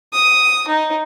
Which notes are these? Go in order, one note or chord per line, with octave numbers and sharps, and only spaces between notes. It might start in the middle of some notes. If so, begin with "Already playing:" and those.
D#6
D#4